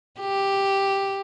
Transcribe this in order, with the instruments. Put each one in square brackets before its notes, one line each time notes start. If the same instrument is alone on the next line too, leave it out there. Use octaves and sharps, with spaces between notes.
[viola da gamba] G4